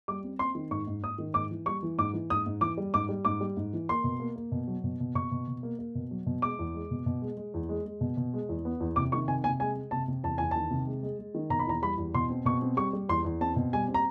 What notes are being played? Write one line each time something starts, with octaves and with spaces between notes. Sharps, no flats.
G3 D6
C4
C4 C6
D#3
G#2 C#6
G#2
G#2 D#6
D#3
G#2 D6
E3
G3 C#6
E3
G#2 D6
E3
G#2 D#6
G#2
E3 D6
G3
G#2 D6
G3
G#2 D6
G3
G#2
E3
A#3 C6
B2
A#3
A#3
B2
F#3
B2
B2
B2 C#6
B2
B2
A#3
A#3
B2
F#3
B2
G#3 D6
E2
G#3
B2
B2
G#3
G#3
E2
G#3
G#3
B2
B2
G#3
E2
B3
E2
C3 D6
D#3 C#6
C3 G#5
C3 G#5
G#3 G#5
G#3
C3 A5
C3
E2 A5
E2 G#5
D#3 A5
C3
G#3
G#3
G#3
D#3
B2 A#5
B5
E2 A#5
G3 B5
E2
B2 C6
C4
B2 C#6
C4
G3 C#6
G3
E2 C6
E2
C4 A5
B2
G3 G#5
C4
A#5